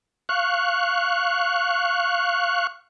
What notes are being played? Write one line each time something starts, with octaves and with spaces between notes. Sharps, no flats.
F5 C#6 F#6